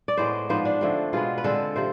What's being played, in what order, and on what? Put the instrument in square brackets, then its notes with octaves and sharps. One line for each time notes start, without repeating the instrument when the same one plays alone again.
[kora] D5
A2 G#3 B3 C5
G#2 F3 B3 C5
D4
D3 F3 A3 C4
B2 G#3 B3 F4
B4
D3 G#3 C4 A4
C3 F3 C5